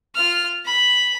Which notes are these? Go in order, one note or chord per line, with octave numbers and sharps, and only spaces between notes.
F4 F6
B5